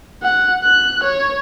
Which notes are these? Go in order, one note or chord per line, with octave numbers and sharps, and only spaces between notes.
F#5
F#6
C#5